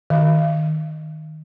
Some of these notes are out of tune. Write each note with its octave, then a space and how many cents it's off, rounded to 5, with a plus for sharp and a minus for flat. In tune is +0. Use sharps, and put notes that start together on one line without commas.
D#3 +0 F5 -35